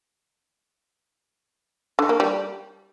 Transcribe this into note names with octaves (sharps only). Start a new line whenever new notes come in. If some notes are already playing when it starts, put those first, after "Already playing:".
D3
A#3
G3